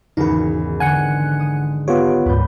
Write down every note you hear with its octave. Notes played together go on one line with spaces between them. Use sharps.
G#1 E2 C#3 D#4 F#4
D3 F#5 G#5 F#6 C#7
D#6
B3 F4 G4 C#5
D2 G#2 B4 G6